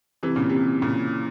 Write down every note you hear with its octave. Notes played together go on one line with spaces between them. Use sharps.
C3 E3
A#2 C#3
C3
A#2 C#3